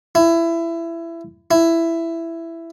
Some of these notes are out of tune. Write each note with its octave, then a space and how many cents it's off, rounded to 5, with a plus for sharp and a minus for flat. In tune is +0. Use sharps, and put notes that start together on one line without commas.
E4 +20
E4 +10